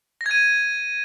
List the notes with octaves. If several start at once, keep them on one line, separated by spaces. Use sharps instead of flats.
A#6
G#6
D#7